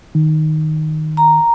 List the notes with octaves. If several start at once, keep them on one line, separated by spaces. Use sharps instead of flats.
D#3
A#5